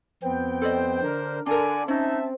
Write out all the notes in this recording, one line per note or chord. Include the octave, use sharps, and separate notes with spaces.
F2 B3 C4 G5
A4 C5 D5 D#5
D3 D4 A#4
D3 D4 A4 A#4 D5 G#5
C4 C#4 D#4 E5 A5